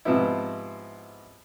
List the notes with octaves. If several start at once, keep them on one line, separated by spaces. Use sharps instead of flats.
G#2 C3 F3 B3 C4 E4